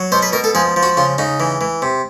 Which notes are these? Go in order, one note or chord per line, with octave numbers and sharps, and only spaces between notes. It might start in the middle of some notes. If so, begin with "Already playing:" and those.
Already playing: F#3
B2 C5
B4
B2 A#4
A4
F3 G#4
F3
F#4
C#3 F4
C#3 D#4
E3
E3
C3